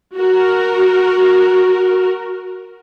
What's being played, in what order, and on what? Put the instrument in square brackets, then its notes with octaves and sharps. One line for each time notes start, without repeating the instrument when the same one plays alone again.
[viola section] F#4 A#4